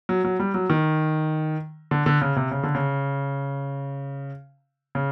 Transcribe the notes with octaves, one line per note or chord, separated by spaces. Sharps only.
F#3
F#3
G3
F#3
D#3
D3
D3
C#3
C3
C#3
D3
C#3
C#3